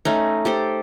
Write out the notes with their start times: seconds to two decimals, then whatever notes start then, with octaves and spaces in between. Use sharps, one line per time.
0.05 A3 C#4 D#4
0.45 G4 A4 C5